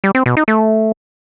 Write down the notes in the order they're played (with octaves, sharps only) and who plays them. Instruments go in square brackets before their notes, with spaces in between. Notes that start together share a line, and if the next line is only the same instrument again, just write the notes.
[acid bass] G3
C4
B2
D#4
A3